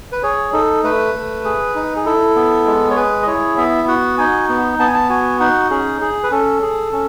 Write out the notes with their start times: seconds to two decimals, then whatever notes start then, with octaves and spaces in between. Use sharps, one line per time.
0.12 B4
0.23 G#4 C#5
0.53 D#4 A4
0.84 A3 B4
1.14 A3
1.44 G#4
1.75 D#4
1.96 G#4
2.05 E4 A4
2.36 B3
2.66 G#3
2.90 C#5
2.97 G#4 B4
3.22 D#5
3.27 E4 C#5
3.57 B3 E5
3.88 F#4 F#5
4.18 D#4 G#5
4.49 B3
4.79 B3 A5
4.87 G#5
4.94 A5
5.10 F#4 G#5
5.40 D#4 F#5
5.70 C#4 G#4
6.01 G#4
6.23 B4
6.31 C#4 A4
6.62 G#4
6.92 C#4